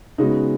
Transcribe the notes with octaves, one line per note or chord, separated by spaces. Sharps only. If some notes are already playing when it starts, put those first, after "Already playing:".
C#3 G#3 B3 D#4 F#4